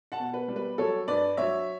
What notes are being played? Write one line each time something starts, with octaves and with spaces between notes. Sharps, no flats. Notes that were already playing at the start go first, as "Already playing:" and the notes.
F#5 A5
B2
B4
G3
B4
F#3 A4 C#5
G2 B4 D5
F#3 C#5 E5